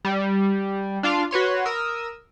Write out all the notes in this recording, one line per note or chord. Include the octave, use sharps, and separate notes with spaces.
G3
D4 F4 F5
F#4 B4 C#5 C6
A#4 D#6 E6